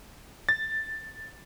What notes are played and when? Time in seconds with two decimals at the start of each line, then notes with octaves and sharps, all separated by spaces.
0.49 A6